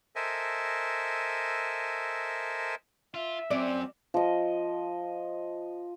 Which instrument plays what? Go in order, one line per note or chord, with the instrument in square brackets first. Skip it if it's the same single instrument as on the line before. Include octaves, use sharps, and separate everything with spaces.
[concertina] A4 A#4 C5 D#5 E5 G#5
[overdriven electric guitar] F4 [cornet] E5
[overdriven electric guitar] F#3 C#4 [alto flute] C4 [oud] D5
[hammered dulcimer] F3 D#5